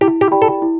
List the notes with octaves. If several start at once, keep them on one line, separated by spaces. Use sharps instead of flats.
E4 G4
G4
G4 D5 G5 B5
A4
E4